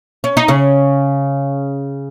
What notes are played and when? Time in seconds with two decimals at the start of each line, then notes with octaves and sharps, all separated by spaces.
0.24 C#4
0.37 D#4
0.48 C#3 C#4